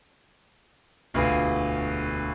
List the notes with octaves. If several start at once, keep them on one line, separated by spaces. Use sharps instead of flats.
E1 D2 F4 F#4 G#4 B4